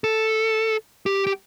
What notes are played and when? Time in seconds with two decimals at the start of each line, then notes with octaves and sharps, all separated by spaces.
0.04 A4
1.06 G4
1.27 G4